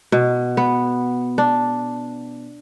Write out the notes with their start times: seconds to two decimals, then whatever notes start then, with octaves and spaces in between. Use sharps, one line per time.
0.12 B2
0.57 B3
1.38 D4